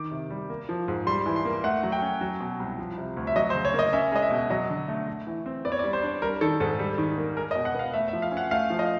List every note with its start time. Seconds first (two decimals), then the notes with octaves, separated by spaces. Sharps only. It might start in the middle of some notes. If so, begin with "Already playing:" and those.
Already playing: D#3 D6
0.11 C3
0.30 G3
0.50 A#3
0.69 F3
0.88 G#2
1.07 G3 C6
1.26 E3
1.36 C6
1.45 A#3
1.64 A3 F#5
1.83 F#3
1.92 G5
2.02 C#4
2.21 F#3
2.41 B2
2.60 C2
2.78 F3
2.98 C3
3.17 D2
3.27 E5
3.36 F#3 D#5
3.50 C5
3.55 C#3
3.65 C#5
3.74 A#3 D#5
3.93 C#4 E5
4.12 G#3 D#5
4.22 E5
4.31 B2
4.50 F#3 D#5
4.69 D3
4.88 A3
5.08 A3
5.27 E3
5.46 C4
5.65 B3 D5
5.72 C#5
5.79 D5
5.84 G3
5.93 C5
6.03 D4
6.22 G3 A#4
6.41 D#3 A4
6.60 G#2 A4
6.79 G3
6.98 D#3
7.18 A#3
7.36 G#3 A#4
7.51 D#5
7.55 B2
7.65 F#5
7.75 B3 F5
7.93 A3 E5
8.08 E5
8.13 F3
8.22 F5
8.32 C#4
8.37 F#5
8.51 A3 F5
8.70 F3
8.79 D#5